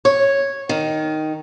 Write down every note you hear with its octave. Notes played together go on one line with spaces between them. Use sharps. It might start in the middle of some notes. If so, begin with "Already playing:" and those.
C#5
D#3